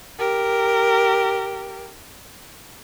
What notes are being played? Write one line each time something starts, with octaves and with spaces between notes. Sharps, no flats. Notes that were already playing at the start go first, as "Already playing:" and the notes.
G4 A#4